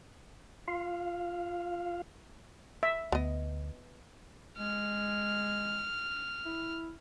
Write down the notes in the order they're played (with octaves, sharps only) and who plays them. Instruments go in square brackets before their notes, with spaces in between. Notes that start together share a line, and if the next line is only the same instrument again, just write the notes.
[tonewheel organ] F4 F5
[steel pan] E5
[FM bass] D2 [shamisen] B3 D#5
[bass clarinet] G#3 [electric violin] F6
[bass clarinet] E4